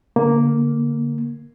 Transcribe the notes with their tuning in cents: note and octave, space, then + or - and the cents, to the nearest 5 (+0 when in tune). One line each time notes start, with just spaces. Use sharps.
D3 -30 A#3 +0